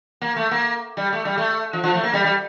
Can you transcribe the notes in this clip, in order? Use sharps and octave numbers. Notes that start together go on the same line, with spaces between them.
A#3
A3
A#3
G3
A3
G3
A3
F3
F3
A3
A#3
G3
G3